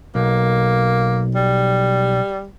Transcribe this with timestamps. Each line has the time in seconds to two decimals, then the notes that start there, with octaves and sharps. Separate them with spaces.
0.15 B1 A#3
1.35 G3